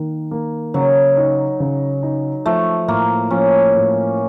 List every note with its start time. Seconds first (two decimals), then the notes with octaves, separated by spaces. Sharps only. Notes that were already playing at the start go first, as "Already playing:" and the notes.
Already playing: D#3 A#3
0.31 A#3
0.74 C#3 F#3
1.17 D#4
1.60 C#3
2.03 D#4
2.46 F3 A3
2.88 A2 A#3
3.30 F3 C#4
3.74 A2